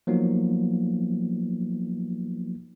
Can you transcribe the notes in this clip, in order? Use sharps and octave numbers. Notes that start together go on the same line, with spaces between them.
F3 F#3 A#3 B3 D#4